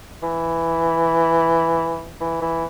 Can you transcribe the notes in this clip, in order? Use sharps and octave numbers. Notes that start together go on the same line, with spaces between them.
E3
E3
E3